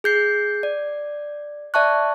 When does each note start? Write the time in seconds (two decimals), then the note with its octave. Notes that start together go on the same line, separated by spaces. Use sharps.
0.04 G#4 G6 C7
0.63 D5
1.74 D5 E5 A5 C#6 F#6